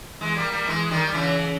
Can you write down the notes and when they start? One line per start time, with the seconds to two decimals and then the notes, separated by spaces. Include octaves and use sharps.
0.21 E3 G#3
0.36 G3 A#3
0.52 G3 A#3
0.67 E3 G#3
0.91 D#3 G3
1.08 G3
1.14 C#3 E3